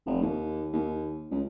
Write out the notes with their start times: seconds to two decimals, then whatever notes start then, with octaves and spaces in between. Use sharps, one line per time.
0.06 F1
0.22 D#2
0.73 D#2
1.31 C#2